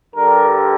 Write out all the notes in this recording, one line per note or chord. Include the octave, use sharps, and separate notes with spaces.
G2 D3 G3 A#4